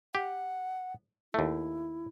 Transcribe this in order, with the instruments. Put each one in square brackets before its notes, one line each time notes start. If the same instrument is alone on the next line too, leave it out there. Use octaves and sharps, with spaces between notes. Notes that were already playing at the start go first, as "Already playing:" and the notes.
[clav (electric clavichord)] G4 [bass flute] F#5
[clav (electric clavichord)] D#2 A3 [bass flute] E4